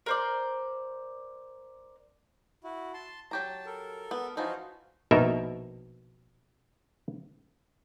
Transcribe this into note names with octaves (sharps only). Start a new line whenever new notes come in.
A#4 C5 D5
E4 F#4
A5 C6
F#3 G4 A5 A#5
A4 A#4
B3
E3 F3 D#4 F4 F#4
A#1 B2 D#4 A#4 E5